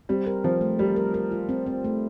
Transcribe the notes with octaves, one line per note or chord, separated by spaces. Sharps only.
G3 C4
A#4
F3 C4
A3
G3 A#4
A#4
A#4
F4
C4
C4
A3